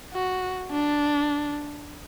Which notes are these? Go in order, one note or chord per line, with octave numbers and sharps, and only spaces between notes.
F#4
D4